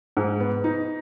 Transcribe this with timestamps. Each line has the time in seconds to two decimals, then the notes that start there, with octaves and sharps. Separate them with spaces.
0.17 G#2
0.40 B3
0.64 D#4